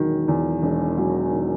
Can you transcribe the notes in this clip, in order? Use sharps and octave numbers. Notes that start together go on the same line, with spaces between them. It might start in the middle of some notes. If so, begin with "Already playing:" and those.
Already playing: E1 D#3 F#3
E2
E1
F#3
D#3